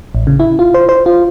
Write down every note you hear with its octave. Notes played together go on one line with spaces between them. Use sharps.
A1
C#3
E4
F4
C5
C5
F4